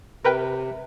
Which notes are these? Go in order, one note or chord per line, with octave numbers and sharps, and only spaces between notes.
C3 A#4 B4 G5